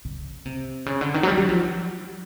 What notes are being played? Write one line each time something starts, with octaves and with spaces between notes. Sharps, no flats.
C#3
C3
C#3
D3
D#3
F#3
G3
F#3
F3